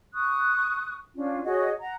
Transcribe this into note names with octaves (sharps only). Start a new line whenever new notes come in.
C#6 D#6 F#6
C#4 D4 F4
F#4 G#4 C#5 D#5
F#5 A#5